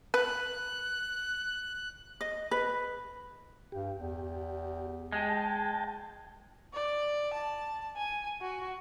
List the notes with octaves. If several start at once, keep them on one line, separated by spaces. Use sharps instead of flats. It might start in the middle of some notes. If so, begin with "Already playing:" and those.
B4 F#6
D#5
B4
G2 G4
E2
G#3 G5 A5
D5
A5
G#5
F#4